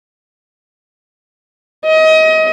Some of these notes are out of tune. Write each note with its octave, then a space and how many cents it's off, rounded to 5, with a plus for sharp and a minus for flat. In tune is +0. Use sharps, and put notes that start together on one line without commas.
D#5 +30